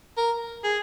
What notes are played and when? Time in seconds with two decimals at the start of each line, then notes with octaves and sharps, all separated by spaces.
0.17 A#4
0.64 G#4